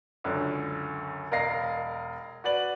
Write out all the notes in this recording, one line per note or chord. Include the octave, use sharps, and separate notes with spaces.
C#2 F#2 D3
E1 A#4 D#5 F5 A#6 C7
F#4 B4 D5 F#7